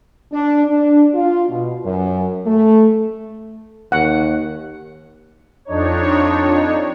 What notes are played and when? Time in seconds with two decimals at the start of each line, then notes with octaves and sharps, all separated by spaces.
0.32 D4
0.66 D4
1.13 F4
1.49 B2
1.84 F#2
2.46 A3
3.92 D#2 F#5
5.65 F2 D4 D#4 C#5